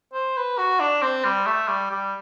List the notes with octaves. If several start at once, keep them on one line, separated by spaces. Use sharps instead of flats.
C5
B4
F#4
D4
C4
G3
A3
G3
G3